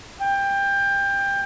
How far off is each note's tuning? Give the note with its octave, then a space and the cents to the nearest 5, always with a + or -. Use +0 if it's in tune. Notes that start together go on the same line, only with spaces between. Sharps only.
G5 +20